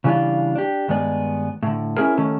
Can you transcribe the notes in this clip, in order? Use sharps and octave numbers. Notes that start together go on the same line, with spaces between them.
C#3 E3 G3 C#4 D4 F4
D4 G4
G2 D#3 G#3 B3 D5
A2 D3
C#4 D4 E4 G#4 A#4
D#2 D#3 A3 C#4 A4